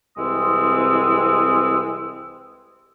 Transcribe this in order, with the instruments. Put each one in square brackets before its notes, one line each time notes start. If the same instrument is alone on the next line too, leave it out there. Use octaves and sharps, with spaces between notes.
[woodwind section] C2 E3 G#3 C4 D#6 E6